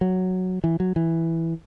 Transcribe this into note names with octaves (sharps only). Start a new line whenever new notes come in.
F#3
E3
F#3
E3